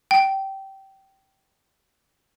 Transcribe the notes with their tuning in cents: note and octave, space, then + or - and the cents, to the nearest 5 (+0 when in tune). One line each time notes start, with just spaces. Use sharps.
G5 -20